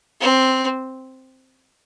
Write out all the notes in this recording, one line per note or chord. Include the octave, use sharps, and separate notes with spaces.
C4